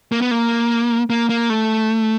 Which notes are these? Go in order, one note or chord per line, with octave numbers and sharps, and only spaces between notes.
A#3
B3
A#3
A#3
A#3
A3